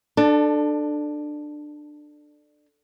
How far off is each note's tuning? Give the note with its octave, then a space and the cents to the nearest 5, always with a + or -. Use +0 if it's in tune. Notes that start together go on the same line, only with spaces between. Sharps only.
D4 +20 A4 +0